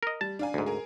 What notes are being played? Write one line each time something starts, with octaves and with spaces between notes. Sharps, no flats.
A#4 D#5
G3 A5
D4 F5 G#5
D2 G#2
G#4 A#4